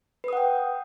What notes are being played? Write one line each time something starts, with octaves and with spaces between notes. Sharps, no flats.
B4 F#5 G5 D#6